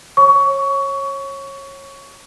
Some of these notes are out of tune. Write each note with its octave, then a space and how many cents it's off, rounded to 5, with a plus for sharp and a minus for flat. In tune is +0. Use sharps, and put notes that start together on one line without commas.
C#5 -25 C#6 +20